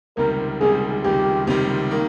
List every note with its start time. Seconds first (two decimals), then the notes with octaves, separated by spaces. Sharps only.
0.17 C#2 C3 D#3 G3 A#4
0.60 C#2 C3 D#3 G3 G#4
1.04 C#2 C3 D#3 G3 G4
1.47 C#2 C3 D#3 G3
1.91 D#3 A#3 D#4